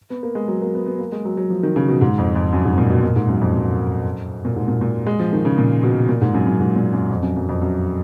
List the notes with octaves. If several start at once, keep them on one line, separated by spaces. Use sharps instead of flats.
B3
A#3
G#3
F#3
A#3
B3
B3
A#3
G#3
F#3
F#3
F3
D#3
C#3
B2
G#2
F2
F2
F#2
G#2
A#2
B2
A#2
G#2
F#2
F2
F#2
A#2
G#2
A#2
A#2
G#3
F3
D#3
C#3
A#2
B2
A#2
G#2
F#2
F#2
G#2
A#2
F#2
F2
F#2
F#2
F2
F#2